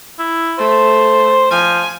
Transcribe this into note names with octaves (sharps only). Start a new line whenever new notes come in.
E4
A3 C5
F3 G#5